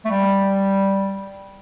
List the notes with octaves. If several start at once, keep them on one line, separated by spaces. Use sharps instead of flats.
A3
G3